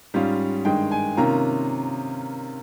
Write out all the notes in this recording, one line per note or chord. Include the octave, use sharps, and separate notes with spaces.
G#2 G3 C#4 F4
G2 D#3 G#3 G5
G#5
C3 D#3 A#3 C#4 F4 A#5